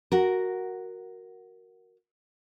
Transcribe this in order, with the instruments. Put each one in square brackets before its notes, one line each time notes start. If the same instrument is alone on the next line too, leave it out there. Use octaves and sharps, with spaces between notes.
[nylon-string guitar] F#4 A#4